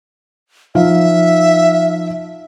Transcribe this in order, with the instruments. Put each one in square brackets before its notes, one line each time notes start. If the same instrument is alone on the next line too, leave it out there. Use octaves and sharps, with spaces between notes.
[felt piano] F3 D#4 F5 [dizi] E5